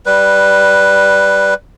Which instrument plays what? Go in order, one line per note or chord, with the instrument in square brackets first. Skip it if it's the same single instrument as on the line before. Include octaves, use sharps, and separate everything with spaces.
[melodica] G3 B4